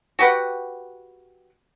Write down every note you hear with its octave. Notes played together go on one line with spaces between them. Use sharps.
F#4 G4 B4 F#5